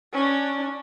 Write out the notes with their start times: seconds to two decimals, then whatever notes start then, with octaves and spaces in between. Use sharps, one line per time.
0.13 C#4 D4